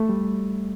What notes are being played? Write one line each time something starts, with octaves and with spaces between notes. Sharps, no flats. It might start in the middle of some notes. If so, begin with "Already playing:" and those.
Already playing: A3
G3